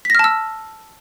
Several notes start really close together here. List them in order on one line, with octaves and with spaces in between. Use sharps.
B6 A#6 F6 A5 E6